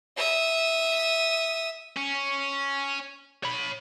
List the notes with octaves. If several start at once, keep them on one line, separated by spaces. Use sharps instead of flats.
E5 D#6
C#4
C#5 B5